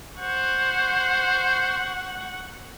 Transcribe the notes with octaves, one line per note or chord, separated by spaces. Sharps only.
C5 F#5 C#6